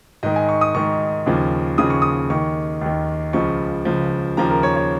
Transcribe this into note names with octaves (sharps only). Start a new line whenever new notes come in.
G#2 D#3 D#5
G#5
C#6
D#6
G#2 D#3 C#6
D#2 C#3 F3
D#2 C#3 F3 D#6
C#6
D#6
D#2 D#3 C#6
D#2 D#3
C#2 C#3 F3 C#6
C#2 C#3 F3
D#2 C#3 F3 A#5
A#4
C#5
C#5